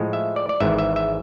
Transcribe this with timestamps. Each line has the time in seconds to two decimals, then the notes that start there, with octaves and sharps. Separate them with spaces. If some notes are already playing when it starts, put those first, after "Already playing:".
Already playing: A2 F3 G#3
0.13 E5
0.36 D5
0.49 D5
0.60 G#1 G#2 E3 E5
0.78 E5
0.96 E5